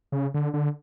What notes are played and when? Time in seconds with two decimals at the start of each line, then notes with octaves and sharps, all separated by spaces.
0.12 C#3
0.34 D3
0.54 D3